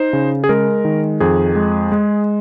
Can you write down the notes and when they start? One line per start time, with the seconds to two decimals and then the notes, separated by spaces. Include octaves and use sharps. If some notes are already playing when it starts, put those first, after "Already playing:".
Already playing: D#4 C5
0.13 C#3
0.44 G#4
0.49 G#3 A#4
0.85 D#3
1.20 F2 G#4
1.56 G#3
1.92 G#3